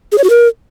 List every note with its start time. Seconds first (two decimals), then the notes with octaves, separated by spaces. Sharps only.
0.12 G#4
0.18 C#5
0.24 F#4
0.30 A#4